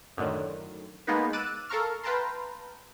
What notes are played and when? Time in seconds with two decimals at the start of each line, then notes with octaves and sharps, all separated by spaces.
0.17 F#2 A2 D3 D#3
1.07 G#3 A#3 B3 D#4 B4
1.33 D6 E6 F#6 A6 D#7 E7
1.69 A4 A#4 F5 A#5 C#6 F6
2.03 B4 F5 G5 A5 A#5 C6